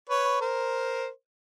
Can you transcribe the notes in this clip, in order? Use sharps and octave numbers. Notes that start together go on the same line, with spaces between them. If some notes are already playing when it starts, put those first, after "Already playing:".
B4 C#5
A#4 C5